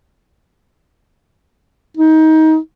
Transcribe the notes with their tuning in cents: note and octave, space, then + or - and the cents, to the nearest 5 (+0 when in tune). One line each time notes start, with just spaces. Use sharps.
D#4 +25